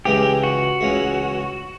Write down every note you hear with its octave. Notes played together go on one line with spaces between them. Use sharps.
C#2 C#3 E3 G#3 G4
F#4
C#2 C#3 E3 G#3